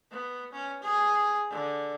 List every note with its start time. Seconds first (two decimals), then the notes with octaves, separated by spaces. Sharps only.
0.11 B3
0.53 C#4
0.83 G#4
1.51 D3